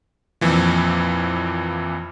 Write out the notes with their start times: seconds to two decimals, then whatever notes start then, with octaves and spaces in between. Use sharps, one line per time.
0.41 F2 A#2 E3 F3